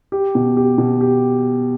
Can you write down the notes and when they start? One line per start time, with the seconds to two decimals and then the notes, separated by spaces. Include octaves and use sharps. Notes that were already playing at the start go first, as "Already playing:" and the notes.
0.12 G4
0.35 B2
0.57 G4
0.78 B2
1.01 G4